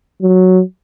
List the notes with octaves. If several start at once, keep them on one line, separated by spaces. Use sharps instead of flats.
F#3